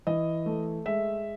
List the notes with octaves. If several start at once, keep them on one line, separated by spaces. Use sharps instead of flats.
E3 D#5
A3
G#3 E5